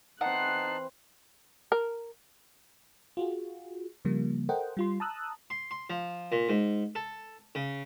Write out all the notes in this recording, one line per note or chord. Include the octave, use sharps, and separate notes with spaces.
E3 C4 D#4 F#5 A5 F#6 C7
A#4
F4 F#4 G#4
C#3 F3 G3 A#3
A4 A#4 C5 D#5 F#5 G5
G3 F4 C6
A5 A#5 D#6 E6 F#6
C6
C6
F3
A#2
G#2
A4
C#3